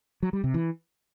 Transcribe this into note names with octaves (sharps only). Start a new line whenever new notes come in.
F#3
G3
C3
E3